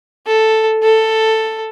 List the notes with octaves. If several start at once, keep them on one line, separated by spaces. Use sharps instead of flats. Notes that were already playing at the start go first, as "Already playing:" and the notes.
A4
A4